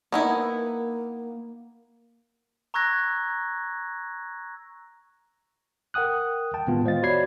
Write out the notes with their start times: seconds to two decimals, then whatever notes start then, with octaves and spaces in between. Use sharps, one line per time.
0.12 A#3 B3 D#4 E4
2.74 A#5 C#6 E6 F#6 G#6 A#6
5.94 A#4 F#5 G5 D#6 F#6
6.54 G5 A5
6.67 A2 D#3 G#3 B3 F4
6.86 C5 D#5 F5 A6
7.03 F#4 C#5 D5 B5 G#6 C7